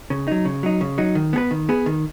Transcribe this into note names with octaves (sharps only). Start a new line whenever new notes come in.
C#3
F#3 D#4
C#3
F#3 D#4
C#3
F#3 D#4
D#3
B3 G#4 B4
D#3
B3 G#4 B4
D#3